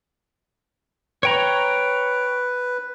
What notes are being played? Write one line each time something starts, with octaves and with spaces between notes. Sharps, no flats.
B4 C#5 G5 A#5